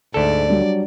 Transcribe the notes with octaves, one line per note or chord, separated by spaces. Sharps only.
D2 G#2 A4 D5
F#3 G3 D4